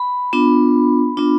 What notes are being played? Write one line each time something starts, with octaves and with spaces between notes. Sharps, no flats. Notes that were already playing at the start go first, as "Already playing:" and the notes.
Already playing: B5
B3 D4 F4
B3 D4 F4